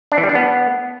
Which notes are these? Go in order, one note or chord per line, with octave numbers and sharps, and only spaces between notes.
D4
E3
G3
D4
B3